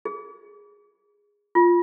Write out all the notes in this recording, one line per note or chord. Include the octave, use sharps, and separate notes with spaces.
G#4
F4